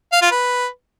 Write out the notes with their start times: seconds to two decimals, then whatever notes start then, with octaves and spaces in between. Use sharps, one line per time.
0.13 F5
0.22 F4
0.32 B4